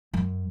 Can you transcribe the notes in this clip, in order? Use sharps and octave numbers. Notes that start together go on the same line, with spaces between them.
F#2